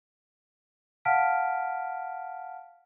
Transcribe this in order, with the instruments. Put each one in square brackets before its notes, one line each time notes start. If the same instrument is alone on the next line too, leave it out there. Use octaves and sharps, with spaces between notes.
[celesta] F5 F#5 A5 F6 B6 D7